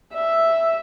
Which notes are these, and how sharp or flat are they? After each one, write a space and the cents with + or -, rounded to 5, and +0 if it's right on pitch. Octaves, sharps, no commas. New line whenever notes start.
E5 +0